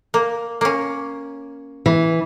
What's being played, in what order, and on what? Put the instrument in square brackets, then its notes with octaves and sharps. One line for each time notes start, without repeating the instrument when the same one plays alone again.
[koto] A#3
A#3 C#4
[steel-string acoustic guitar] E3